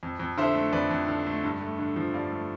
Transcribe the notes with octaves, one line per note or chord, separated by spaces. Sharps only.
F2
F2
D3 C5 E5
A3
F2 B4 D5
F2
D3
A3
G2
A3
D3
F3
G2 D5 F5
A3